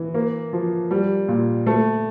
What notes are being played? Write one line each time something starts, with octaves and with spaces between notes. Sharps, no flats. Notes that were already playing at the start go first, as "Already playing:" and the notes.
Already playing: E3
A#3
F3
G3
A#2
A3